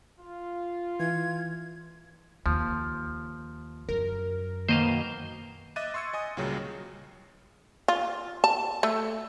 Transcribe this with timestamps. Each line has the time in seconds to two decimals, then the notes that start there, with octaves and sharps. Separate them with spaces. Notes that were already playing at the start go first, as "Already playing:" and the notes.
0.19 F4
1.00 E3 G#6
2.46 D#2 F3
3.89 F#2 A#4
4.69 B2 D#3 A#3 C5 D#5 F5
5.76 D#5 E5 D6 F#6 A6 D#7
5.94 C6 C#6 E6 G#6 C#7
6.13 D#5 G#5 D#6
6.37 C#2 A#2 C#3 F#3 G3
7.88 F4
8.44 A5
8.83 A3